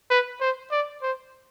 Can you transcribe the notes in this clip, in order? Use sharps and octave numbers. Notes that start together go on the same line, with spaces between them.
B4
C5
D5
C5